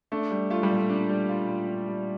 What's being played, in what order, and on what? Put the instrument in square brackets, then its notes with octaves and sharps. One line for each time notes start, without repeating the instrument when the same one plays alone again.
[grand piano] A3 [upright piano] D4
[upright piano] G3
[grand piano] A3 [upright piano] F4
[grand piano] G3
[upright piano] A#2
[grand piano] A3
[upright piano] D4
G3
F4
A#2
D4
G3